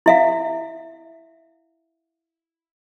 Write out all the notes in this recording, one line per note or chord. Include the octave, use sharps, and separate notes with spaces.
E4 E5 F5